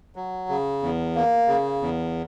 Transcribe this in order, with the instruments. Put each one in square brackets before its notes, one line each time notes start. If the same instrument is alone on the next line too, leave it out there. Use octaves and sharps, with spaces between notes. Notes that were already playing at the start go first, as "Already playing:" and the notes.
[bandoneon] F#3
C#3
E2
A#3
C#3
E2